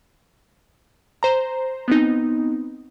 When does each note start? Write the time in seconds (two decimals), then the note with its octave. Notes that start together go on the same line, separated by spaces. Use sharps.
1.23 C5 A#5
1.88 B3 C4 D#4